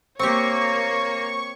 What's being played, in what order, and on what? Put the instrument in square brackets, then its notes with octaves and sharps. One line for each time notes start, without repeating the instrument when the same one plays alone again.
[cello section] A#3 [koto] C4 G4 [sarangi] C#5 [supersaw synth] C#6